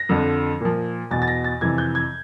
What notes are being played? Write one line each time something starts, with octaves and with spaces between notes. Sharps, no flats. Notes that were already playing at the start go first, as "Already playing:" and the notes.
Already playing: A#6
F2 D3 F3
A#2 F3
E2 B2 A6
A6
A#6
A6
F2 C3 E3 G#6
G6
G#6